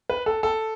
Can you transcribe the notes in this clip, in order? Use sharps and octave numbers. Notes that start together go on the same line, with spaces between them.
B4
A4
A4